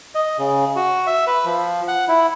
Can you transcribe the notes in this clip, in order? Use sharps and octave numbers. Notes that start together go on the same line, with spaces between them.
D#5
C#3
F#4
E5
B4
F3
F#5
E4